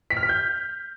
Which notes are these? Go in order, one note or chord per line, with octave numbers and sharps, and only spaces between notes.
B6
F6
B6
G6